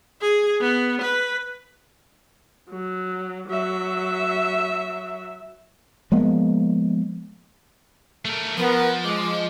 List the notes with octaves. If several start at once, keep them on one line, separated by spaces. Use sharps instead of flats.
G#4
B3
B4
F#3
F#3 E5
F3 G#3 A#3 B3
A3 A#4
F3 B3 A#4
G#3 D6